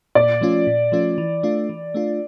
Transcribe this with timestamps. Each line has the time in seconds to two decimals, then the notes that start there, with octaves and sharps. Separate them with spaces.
0.15 A#2 D5
0.41 F3 A3 C#4 F4
0.67 A#2
0.92 F3 A3 C#4 F4
1.18 E3
1.43 A3 D4 F4
1.69 E3
1.94 A3 D4 F4